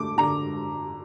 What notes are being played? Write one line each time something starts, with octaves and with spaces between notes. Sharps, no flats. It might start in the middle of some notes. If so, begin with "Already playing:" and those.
Already playing: D3 A3 D6
D3 A#5